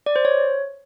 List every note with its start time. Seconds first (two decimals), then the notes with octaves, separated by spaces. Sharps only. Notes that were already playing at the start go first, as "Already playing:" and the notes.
0.06 D5
0.16 C5
0.25 C#5